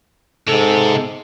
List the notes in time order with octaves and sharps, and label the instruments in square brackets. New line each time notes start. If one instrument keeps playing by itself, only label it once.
[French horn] G#2 [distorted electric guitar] C3 [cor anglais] A4